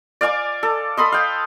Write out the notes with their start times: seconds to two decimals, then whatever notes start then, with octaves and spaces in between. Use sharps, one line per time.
0.21 D5 F5 G#5 D6
0.63 A4
0.97 A4 B5 C6 D#6
1.12 F5 G5